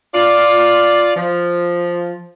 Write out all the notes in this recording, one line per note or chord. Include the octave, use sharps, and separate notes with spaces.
F4 D5
F3